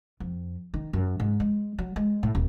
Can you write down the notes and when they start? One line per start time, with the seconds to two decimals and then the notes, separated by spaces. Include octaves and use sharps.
0.20 F2
0.74 D#3
0.93 F#2
1.20 G#2
1.40 G#3
1.79 F#3
1.96 G#3
2.23 A2
2.35 D#1